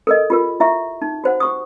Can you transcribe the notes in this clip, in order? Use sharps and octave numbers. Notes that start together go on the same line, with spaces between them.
A4 A#4 D#5
F4 G4 A#4
E4 E5 C#6
D#4
F#4 C5 F#5
G4 C#6 D#6